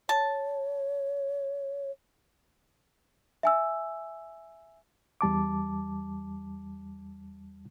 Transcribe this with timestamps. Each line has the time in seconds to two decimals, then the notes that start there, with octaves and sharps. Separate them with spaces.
0.09 C#5 A5
3.43 E5 G#5 E6
5.21 E2 G3 A5 D6